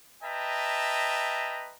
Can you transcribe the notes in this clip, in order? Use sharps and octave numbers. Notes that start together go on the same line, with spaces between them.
B4 D#5 E5 G5 A5 A#5